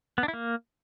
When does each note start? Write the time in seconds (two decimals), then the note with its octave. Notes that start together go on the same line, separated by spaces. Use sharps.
0.18 B3
0.23 D4
0.28 E4
0.33 A#3